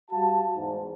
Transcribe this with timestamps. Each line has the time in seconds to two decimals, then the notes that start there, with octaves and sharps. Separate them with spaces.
0.11 G3 F#4 F5 A5
0.55 E2 G#2